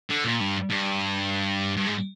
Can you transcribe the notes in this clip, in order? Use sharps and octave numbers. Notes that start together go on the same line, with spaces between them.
D3
A#2
G2
G2
G2
G#2